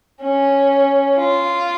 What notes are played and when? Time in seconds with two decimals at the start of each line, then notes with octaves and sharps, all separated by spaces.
0.22 C#4
1.17 F4